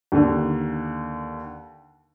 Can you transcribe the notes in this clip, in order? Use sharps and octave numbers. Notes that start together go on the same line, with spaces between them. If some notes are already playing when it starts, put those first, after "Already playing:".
D#2 D3